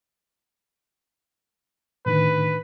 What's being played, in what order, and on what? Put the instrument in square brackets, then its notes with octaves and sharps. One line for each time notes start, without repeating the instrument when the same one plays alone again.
[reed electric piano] A2 D3 D#3 [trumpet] B4